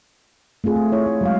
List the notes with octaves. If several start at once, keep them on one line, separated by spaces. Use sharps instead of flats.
A3 C4 F4 G#4
A3
E4 C#5
A3
F#3 G#3 F5